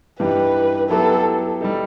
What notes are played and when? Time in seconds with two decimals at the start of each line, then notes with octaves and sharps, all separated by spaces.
0.20 G2 E3 G3 D#4 G4 B4
0.89 F#3 B3 E4 G4 A4 B4
1.61 G3 D#4 A4